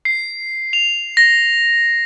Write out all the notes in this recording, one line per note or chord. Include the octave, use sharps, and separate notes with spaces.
C7
F7
A#6